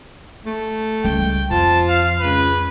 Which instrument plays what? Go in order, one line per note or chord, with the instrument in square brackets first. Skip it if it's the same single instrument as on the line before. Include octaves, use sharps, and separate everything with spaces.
[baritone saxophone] A3
[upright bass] C#2 G3 [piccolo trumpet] G5
[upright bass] F2 [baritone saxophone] F3 [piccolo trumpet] A5
[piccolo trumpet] F5
[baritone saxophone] C#2 [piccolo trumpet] B4